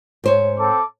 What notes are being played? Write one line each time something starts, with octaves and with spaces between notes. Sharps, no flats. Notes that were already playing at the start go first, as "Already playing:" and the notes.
G#2 C5 C#5
C4 A4 D6